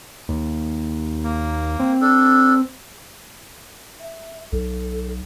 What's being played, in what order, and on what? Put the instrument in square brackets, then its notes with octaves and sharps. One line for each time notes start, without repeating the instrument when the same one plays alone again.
[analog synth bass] D#2
[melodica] A#3
[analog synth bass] C4
[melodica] D4 A4
[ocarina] E5
[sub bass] B1 [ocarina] A4